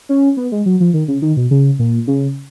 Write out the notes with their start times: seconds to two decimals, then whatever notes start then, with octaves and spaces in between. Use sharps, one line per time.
0.09 C#4
0.37 B3
0.52 G#3
0.66 F#3
0.80 F3
0.94 D#3
1.08 C#3
1.22 D#3
1.37 B2
1.51 C#3
1.79 A#2
2.07 C#3